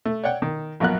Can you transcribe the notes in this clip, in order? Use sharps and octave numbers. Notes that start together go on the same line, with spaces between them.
A3
C#5 D5 F#5 G5
D#3
A#1 F#2 B3 A#4 F#6